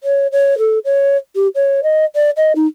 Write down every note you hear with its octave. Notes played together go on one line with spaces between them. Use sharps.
C#5
C#5
A4
C#5
G4
C#5
D#5
D5
D#5
D#4